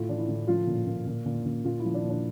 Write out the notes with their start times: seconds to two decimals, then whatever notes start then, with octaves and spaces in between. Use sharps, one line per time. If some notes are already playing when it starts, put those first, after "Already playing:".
Already playing: A2 F4
0.09 E3 D4
0.19 E4
0.28 A2
0.48 F3 F4
0.67 A#2
0.87 A#2
1.07 A#2
1.25 A#2
1.46 A#2
1.65 A#2 F4
1.80 E4
1.85 F3
1.94 D4
2.04 A#2
2.10 D4